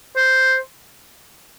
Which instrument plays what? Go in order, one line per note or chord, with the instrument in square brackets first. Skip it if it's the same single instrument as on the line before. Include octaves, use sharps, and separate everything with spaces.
[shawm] C5